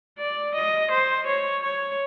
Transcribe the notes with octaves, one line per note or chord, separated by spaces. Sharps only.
D5
D#5
C5
C#5
C#5